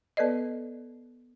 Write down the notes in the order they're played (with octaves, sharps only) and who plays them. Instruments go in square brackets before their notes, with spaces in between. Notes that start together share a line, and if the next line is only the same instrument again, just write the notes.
[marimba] B3 A4 B4 D5 D#5